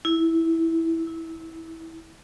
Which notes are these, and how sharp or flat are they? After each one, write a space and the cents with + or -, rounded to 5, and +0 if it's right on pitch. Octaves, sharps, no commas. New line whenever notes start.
E4 -10
E4 -20